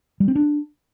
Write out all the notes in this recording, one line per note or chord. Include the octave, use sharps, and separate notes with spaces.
G3
C4
D4